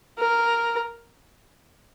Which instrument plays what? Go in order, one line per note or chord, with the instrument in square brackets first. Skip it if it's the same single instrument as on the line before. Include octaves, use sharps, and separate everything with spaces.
[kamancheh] A#4